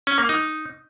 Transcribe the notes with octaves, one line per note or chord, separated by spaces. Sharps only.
C#4
A#3
D#4